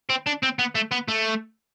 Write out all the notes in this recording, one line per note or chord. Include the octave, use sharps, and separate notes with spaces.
C4
D4
C4
B3
A3
B3
A3